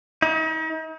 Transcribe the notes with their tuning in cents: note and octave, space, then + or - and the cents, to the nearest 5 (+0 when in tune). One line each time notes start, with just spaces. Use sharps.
D#4 +40